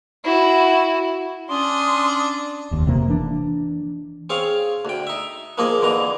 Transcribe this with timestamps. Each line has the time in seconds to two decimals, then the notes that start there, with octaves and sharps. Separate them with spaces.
0.24 E4 F#4
1.49 C#4 D4 C6 D#6
2.71 F1 D#2
2.87 F1 C3 A#3
3.08 E3 D4
4.30 C4 G#4 C#5 F5
4.85 D2 G5
5.07 D#4 E5
5.58 D#3 F3 A#3 D#4 G#4 D#5
5.81 F2 D3 E3 A#5